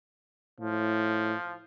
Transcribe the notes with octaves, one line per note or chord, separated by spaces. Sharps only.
A2 F3